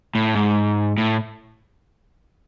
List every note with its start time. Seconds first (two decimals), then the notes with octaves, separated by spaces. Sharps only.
0.15 A2
0.35 G#2
0.98 A2